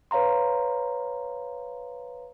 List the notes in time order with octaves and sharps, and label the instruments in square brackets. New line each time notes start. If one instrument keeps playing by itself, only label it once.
[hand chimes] B4 C#5 F5 A#5 C6